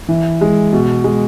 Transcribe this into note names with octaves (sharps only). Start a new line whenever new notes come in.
E3
G#3
B2
G#3